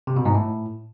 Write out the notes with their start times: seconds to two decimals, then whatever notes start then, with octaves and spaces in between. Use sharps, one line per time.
0.07 C3
0.16 B2
0.25 G#2
0.35 A2